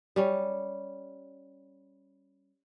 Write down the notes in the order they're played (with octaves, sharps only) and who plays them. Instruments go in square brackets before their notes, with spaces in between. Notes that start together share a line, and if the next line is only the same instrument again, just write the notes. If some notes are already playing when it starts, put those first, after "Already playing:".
[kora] G3 C#4